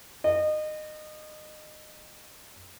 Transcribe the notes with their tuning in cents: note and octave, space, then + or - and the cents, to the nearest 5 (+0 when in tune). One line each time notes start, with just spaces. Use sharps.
D#5 -25